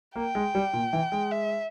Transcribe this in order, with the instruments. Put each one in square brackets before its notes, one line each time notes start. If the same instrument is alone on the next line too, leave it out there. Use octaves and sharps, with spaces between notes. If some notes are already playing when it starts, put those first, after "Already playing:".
[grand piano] A#3 [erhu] G5
[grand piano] G#3
G3
A#2
E3
G#3
[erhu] E5